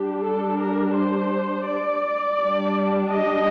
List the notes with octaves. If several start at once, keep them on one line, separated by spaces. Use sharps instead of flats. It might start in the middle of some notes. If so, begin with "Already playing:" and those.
Already playing: G3 D4 G4
A4
A#4
C5
D5
G3 D4
D#5